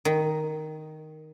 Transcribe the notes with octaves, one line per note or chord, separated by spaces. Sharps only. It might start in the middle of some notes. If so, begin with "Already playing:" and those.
D#3